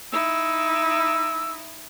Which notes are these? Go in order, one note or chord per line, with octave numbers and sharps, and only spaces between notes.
D#4 E4 E6